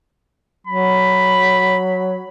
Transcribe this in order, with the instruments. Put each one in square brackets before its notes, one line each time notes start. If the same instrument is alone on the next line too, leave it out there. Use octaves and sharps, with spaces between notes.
[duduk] F#3 [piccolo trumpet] B5